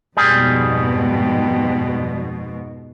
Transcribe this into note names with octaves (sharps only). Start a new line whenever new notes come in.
F2 G#2 B2 G3 G#4